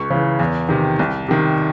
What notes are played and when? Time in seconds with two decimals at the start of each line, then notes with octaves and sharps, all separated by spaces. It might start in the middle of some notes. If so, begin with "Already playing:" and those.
Already playing: C#2 C#6
0.10 C#3 E3
0.39 E2
0.69 C3 D#3
0.99 C2
1.28 C3 D#3